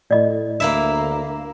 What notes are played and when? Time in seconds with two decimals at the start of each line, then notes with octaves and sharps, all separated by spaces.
0.11 A2 D5 D#5
0.60 D2 A#3 E4 E5